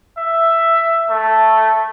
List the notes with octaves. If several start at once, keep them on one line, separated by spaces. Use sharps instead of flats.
E5
A3